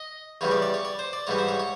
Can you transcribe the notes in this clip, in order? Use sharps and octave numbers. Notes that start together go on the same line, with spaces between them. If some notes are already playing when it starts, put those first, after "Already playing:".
Already playing: D#5
E2 C#3 E3 G3 C#5
D5
D5
C#5
D5
C5
D5
G#2 E3 G3 C#5
C5
C#5
C#5